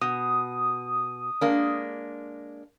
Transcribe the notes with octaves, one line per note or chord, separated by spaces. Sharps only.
B2 D#6
G#3 A#3 D4